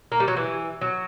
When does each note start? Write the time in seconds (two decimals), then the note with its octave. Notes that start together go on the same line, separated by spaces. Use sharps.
0.12 A#3
0.20 G3
0.28 F#3
0.37 E3
0.81 F#3